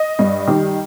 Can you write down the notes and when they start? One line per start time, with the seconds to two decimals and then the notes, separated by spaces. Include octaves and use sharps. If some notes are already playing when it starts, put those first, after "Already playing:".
Already playing: D#5
0.19 G2
0.48 D#3 G3